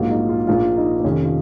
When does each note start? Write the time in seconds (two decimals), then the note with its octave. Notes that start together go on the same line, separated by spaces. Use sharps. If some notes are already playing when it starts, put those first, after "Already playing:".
Already playing: A#1 G#2 F#3 A#3 F4
0.10 D#4
0.29 F4
0.47 A#1 A#2 F3 A#3 F4
0.77 D#4
1.00 C4
1.04 F2 C3 D#3 C#4
1.24 F4